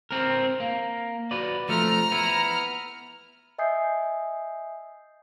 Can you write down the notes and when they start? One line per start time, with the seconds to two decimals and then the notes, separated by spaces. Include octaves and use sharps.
0.11 C4 A#4
0.60 A#3
1.31 F#4 B4 D5
1.69 F3 A3 A#5 F6
2.12 B3 E4
3.58 D#5 E5 G#5 D#6 G6 C7